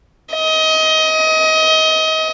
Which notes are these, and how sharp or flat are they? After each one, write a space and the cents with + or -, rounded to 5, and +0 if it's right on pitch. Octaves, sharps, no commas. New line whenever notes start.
D#5 +25